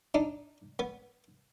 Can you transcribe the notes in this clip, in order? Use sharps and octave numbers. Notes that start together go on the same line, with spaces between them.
D4 D#4
B3